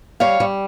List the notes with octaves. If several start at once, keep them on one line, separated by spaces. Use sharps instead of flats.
G3 C#5 F5
G3